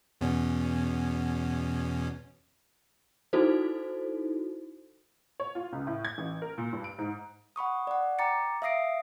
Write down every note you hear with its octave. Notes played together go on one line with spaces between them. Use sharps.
E2 B2 C#4
D#4 E4 F#4 A4 C5
C#5
F4
C#2
A2
G#6
A1
A#4
A#2
G2
D7
G#2
F#5 B5 C#6 D#6
D5 F#5
G5 A#5 D6 A6 C#7
E5 F5 D#6 A#6 C7 D7